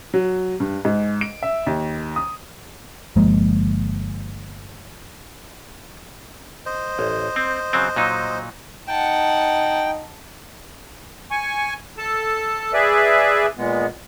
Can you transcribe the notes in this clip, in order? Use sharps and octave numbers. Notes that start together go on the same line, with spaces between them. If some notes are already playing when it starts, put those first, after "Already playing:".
F#3
G2
G#2
D7
E5
D#2
D#6
G1 F3 G#3 A#3
C5 D#5
A1
C4
C#3 F#3 C4
A#2 F#3 D#4
D#4 F#5 G5 A5
G#5 C#6
A4 A5
G#4 B4 D5 E5
A#2 G#3 B3